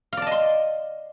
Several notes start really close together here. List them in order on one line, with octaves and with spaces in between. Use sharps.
F5 D5 A5 D#5 C6